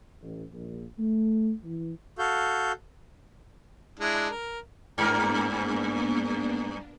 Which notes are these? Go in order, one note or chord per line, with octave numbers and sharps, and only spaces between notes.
A1
A#1
A3
E3
F#4 A4 F5 G6
G#3 D4 E4
A#4
G2 A#3 B3 D4 A#4